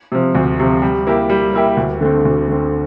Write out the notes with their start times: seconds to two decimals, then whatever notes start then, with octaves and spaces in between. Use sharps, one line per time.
0.12 C3 F3
0.35 D2
0.60 C3 F3
0.82 G3
1.07 A#3 E4 G4
1.29 G3
1.54 A#3 E4 G4
1.77 D2
2.01 D3 A3 C4
2.25 D2
2.48 D3 A3 C4